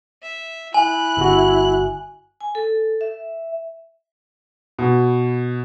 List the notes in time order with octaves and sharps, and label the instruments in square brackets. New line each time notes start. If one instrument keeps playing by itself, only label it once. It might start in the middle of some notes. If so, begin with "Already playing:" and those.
[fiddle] E5
[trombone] E4 [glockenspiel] G#5 [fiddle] F#6
[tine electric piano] G1 F#4
[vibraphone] G#5
A4
E5
[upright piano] B2